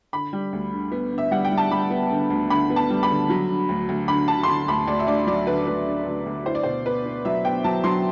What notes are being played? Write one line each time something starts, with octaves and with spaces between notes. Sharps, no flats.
D3 B5
G3
D2
D3
B3
D3
E5
G3 F#5
G5
G3
A5
G3 B5
B3
D3
D2
D3 B5
B3
A5
G3
B5
D3
F#3
D3
D2
D2
D3 B5
D3 A5
C6
D3 B5
D2 B5
D2 D5
E5
D2 D5
F#3 D5
D3 B4
D2 B4
D3
D2
D2
E4 C5
D5
B2 C5
B3 B4
B3
F#3 E5
B3 G5
F#3 A5
F#3 C6